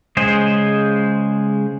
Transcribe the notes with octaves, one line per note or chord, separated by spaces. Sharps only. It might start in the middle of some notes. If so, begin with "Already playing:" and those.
C#3 G#3 G#4 C5